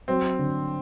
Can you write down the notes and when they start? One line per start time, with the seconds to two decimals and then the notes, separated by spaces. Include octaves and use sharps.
0.08 F#3 C4
0.39 D3